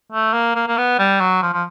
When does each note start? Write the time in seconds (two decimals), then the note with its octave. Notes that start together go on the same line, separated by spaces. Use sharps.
0.12 A3
0.33 A#3
0.55 A#3
0.68 A#3
0.78 B3
0.99 G3
1.20 F#3
1.42 F3
1.53 F3